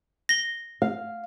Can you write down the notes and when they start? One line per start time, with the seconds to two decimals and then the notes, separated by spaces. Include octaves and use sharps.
0.29 A#6 G7
0.82 F5